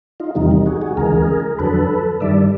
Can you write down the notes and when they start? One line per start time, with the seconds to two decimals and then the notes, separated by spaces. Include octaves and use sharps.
0.20 D#4 F4
0.35 E2 C3 D#3 G3 D#4
0.51 D#4
0.66 F#4 G#4
0.81 F#4 G#4
0.97 D2 C#3 E3 G#3 G#4 A#4
1.59 F2 D3 F#3 A4 B4
2.20 G2 D#3 G3 D5 E5